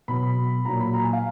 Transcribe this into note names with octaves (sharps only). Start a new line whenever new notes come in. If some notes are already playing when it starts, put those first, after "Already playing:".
B2 F#3 B3 B5
A#2 F#3 A#3 A#5
B5
A#5
G#5
F5